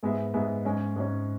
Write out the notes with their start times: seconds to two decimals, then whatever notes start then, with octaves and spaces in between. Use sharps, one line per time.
0.03 G#2 G#3 B3 G#4 E5
0.34 G#2 G#3 B3 G#4 E5
0.65 G#2 G#3 C#4
0.96 G#2 G#3 C#4